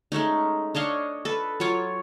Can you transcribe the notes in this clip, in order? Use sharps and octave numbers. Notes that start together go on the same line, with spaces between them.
G#3 A3 C#4 D#4
D4 C#5 D#5 F5
A4 B4
F#3 F4 C#5 D6